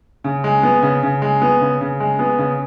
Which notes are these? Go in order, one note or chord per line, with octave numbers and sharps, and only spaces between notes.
C#3
G#3
B3
C#3
C#3
G#3
B3
C#3
C#3
G#3
B3
C#3